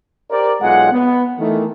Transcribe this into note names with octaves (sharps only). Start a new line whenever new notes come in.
G4 A#4 C5 D5
B1 G#3 F4 F#5
B3
D#3 E3 A3